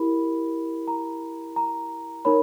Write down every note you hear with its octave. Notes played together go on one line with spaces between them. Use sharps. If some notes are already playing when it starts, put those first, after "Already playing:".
Already playing: E4 G4 A#4 B5
A#5
A#5
D#4 A#4 C#5 B5